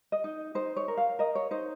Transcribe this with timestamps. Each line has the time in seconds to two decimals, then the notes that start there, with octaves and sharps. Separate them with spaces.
0.12 D#5
0.24 D#4
0.55 D#4 C5
0.77 C#5
0.88 A#4
0.97 F5
1.19 A#4 D#5
1.35 C#5
1.51 D#4 C5